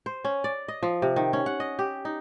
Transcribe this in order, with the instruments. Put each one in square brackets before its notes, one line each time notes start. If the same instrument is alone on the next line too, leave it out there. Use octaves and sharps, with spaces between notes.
[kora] C5
C#4
D5
D#5
F3
C3
D#3
C#4
F#5
D#5
G4
D#4